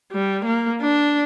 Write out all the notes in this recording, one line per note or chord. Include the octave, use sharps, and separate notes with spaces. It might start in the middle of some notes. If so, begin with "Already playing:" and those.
G3
A#3
D4